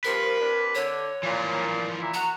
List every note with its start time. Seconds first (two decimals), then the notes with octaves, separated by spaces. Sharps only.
0.04 G2 C3 F3 A#4 B4
0.40 C3 D4
0.75 D3 C#5
1.23 A#2 E3 F3
2.01 A#2 E4
2.14 F#4 A#5